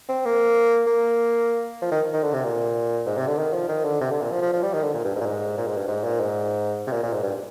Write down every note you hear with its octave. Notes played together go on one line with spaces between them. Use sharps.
C4
A#3
A#3
F3
D#3
D#3
D3
C3
A#2
G#2
C3
D3
D#3
F3
D#3
D3
C3
D3
A#2
F3
F3
F3
G3
D#3
D3
A#2
G2
G#2
A#2
G#2
A#2
G#2
G2
G#2
A#2
G#2
C3
A#2
A#2
G#2
G2